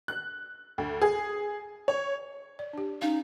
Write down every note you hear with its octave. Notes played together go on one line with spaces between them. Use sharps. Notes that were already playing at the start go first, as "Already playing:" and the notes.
F#6
D2
G#4
C#5
D5
D4 G4
C#4 D#4 F5